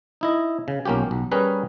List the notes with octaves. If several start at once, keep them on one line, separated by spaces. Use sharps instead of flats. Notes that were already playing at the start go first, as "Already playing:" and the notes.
D#4 E4 D#5
C#3
B1 A#3 C#4 F4 G4
B1
G3 C#4 G#4 A#4 B4